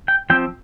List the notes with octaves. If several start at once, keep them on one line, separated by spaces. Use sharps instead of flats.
G5
F3 C4 G5